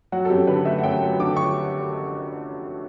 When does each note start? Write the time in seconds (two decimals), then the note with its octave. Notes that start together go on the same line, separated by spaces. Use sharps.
0.12 F#3 F#4
0.25 A4
0.30 F#2 G4
0.47 D3 B4
0.65 A3 E5
0.78 F#5
0.83 F#2 G5
1.01 F#3
1.20 D3 D6
1.37 C#6